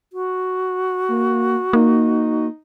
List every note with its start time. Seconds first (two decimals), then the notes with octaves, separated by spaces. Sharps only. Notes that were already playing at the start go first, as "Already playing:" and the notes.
0.13 F#4
1.08 A#3
1.73 A#3 D#4